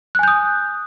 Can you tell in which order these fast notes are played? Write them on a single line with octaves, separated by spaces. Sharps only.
F#6 G#5 G6 D#6